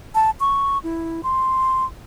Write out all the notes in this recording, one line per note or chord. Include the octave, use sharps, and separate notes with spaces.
A5
C#6
E4
C6